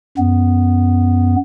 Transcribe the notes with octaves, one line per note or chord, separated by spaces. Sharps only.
F#2 B3